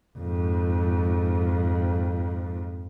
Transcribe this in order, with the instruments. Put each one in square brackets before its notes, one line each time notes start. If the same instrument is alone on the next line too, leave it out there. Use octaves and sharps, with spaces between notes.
[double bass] F2 G#2